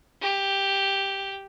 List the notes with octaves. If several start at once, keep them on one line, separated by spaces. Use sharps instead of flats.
G4